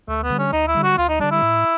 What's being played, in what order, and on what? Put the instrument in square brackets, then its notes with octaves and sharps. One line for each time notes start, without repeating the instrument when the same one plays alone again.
[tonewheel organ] D2 [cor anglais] A3
[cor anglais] B3
[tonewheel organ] D3 G3
[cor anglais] C#4
[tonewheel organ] D2 [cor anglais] D#4
[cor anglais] E4
[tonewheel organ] D3 G3
[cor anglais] F#4
[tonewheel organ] D2 [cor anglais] F4
[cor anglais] D#4
[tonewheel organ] D3 G3 [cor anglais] D4
[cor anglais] E4
[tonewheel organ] A2